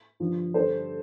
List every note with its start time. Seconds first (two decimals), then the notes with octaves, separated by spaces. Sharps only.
0.20 G2 D3 F3
0.54 G2 D3 G3 A4 C5